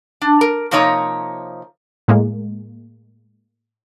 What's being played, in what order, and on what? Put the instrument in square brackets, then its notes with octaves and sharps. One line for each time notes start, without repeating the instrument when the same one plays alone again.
[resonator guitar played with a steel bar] D4
A#4
C3 F3 A#3 D#4 C#5 A#5
[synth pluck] A2 G#3 A#3